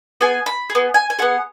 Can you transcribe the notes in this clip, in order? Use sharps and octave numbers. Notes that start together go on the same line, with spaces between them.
B3 G#4 G#5
B5
G#4
B3
G#5
G#5
B3 G#4 F#5